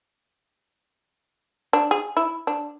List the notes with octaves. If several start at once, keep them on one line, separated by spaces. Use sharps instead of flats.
D4
G#4
E4
D4